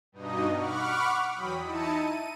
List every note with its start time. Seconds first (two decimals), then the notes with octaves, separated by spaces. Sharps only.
0.12 G2 B2 D#4 D#5
0.52 F#5 B5 C#6 D6 F6
1.32 E2 F#3 G5 B5 D#6 B6
1.62 D#4 E4 A5 C#7 D#7
1.94 D#7